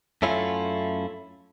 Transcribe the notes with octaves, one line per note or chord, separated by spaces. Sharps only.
F#2 A3 C#4 E4 F4